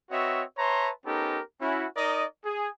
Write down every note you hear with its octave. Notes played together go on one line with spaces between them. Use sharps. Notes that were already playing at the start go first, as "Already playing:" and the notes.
C4 F#4 B4 C#5 D#5 E5
B4 C#5 E5 A5 A#5 C6
B3 C#4 D#4 G4 A4 A#4
C#4 E4 F#4
D#4 A#4 D5 D#5
G#4